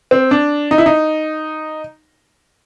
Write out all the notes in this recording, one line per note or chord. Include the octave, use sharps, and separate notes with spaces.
C4
D4
D#4
E4
D#4